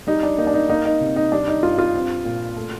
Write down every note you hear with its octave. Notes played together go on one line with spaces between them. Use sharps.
G3 D#4
D4
A#3 D#4
D4
D#4
A#3 D#4
D#4
C3
D#4
G3 D4
D#4
G2 F4
F4
C4
A#2
A3